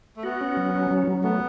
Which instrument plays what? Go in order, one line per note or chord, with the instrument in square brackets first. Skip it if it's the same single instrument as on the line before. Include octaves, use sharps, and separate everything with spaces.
[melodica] A3
[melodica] B3 [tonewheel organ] F#4
[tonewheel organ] C#4
F#3
C#4
F#3
F#3
[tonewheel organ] A3 [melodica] B3